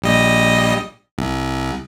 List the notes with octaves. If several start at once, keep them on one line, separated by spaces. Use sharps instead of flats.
A#1 G3 D#5
C2